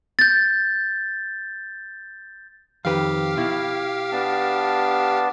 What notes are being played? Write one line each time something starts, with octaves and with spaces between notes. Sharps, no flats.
G6 A6
F2 D#3 G4 B4 F5
B2 E4
B3 D4 A5